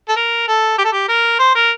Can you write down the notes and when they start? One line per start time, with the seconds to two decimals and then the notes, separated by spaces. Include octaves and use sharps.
0.09 A4
0.16 A#4
0.48 A4
0.78 G4
0.85 A4
0.93 G4
1.08 A#4
1.39 C5
1.55 A#4